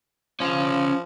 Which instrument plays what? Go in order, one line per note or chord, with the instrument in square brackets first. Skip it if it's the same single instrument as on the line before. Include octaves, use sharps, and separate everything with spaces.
[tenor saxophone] F3 [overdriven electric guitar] C#4 F5